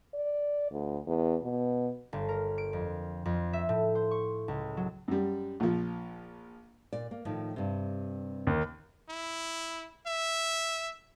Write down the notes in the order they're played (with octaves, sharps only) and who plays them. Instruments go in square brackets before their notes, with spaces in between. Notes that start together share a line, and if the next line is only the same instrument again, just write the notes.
[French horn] D5
D2
E2
B2
[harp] G1
A#4
D7
F2
F2
E5
A2
C5
C#6
C#2
F#3
[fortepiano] F#2 G3
A#1 F3
[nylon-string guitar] A#2 D5
A#3
A2 D#3 F3
G2 C3
[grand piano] D#2
[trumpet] E4
E5